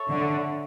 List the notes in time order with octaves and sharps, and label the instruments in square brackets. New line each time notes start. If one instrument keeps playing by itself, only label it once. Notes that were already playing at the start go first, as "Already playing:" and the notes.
Already playing: [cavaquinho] A4 C#5 E5
[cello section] D3